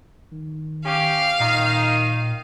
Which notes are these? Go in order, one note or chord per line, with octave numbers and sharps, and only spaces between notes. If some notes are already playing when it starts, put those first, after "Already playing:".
D#3
C#4 G4 F5
A#2 D#3 D#4